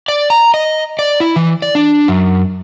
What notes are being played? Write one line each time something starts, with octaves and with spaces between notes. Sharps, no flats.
D5
A#5
D#5
D5
E4
E3
D5
D4
F#2